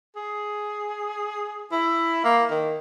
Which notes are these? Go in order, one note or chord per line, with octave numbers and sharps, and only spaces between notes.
G#4
E4
A#3
D#3